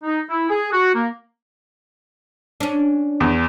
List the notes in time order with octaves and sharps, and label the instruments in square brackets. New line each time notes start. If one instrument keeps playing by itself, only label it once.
[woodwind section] D#4
E4
G#4
F#4
A#3
[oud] C#4 D4
[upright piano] E2